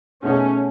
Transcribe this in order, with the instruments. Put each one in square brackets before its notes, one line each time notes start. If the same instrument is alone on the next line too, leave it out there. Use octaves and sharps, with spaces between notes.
[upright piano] B2 A3 D#4 G#4 [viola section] C#4